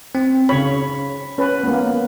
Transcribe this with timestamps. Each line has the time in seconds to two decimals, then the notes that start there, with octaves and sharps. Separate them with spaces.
0.15 C4
0.49 C#3 C#5 B5
1.38 C#4 B4
1.63 A#3 B3